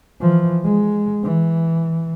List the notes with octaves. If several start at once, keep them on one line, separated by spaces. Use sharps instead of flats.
E3 F3
G#3
E3